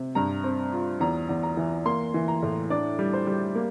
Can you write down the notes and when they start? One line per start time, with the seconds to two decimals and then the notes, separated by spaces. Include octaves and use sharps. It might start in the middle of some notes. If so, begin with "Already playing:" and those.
Already playing: C3
0.15 G2 A#5
0.44 C4
0.72 F4
1.00 E2 A#5
1.29 E2
1.43 A#5
1.57 E3
1.86 A#3 C6
2.14 E3
2.28 A#5
2.43 A2
2.70 D4 D5
2.99 G3
3.13 C5
3.27 G3
3.55 A#3